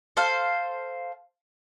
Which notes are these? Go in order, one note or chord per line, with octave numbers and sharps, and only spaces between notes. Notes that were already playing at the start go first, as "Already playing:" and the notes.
A4 C5 F5